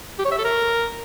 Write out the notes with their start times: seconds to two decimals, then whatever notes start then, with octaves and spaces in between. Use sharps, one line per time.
0.19 G4
0.25 C#5
0.31 E5
0.38 A4
0.44 A#4